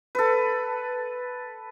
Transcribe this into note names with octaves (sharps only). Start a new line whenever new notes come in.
A4 B4